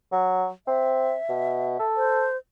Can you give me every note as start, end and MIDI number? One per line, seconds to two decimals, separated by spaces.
0.12 0.48 54
0.67 1.14 60
0.67 1.85 76
1.29 1.78 47
1.79 2.26 69
1.97 2.37 72